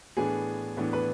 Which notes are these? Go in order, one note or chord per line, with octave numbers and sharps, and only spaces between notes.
A2 E3 B3 D4 G#4
A2 E3 B3 D4
B4